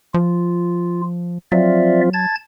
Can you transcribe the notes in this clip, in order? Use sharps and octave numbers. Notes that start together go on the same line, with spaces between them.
F3 F4
F3 F#3 C4 F4 D5 E5
A5 G#6 A6